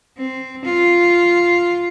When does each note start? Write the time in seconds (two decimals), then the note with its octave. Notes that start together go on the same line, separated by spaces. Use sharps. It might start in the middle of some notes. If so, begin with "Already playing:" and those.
0.19 C4
0.65 F4